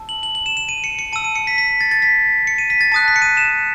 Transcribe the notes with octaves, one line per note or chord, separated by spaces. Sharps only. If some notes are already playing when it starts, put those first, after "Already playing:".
Already playing: A5 E6
F#7
F#7
F#7
E7
E7
D#7
C#7
C#7
A5 E6 D#7
D#7
C#7
B6
B6
A6
A6
B6
C#7
D#7
B6
A6
A5 D#6 F#6 A6
B6
C#7
D#7
E7